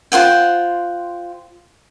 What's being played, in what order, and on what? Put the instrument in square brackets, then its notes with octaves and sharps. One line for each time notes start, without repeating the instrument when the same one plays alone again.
[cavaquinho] F4 C5 F#5 G5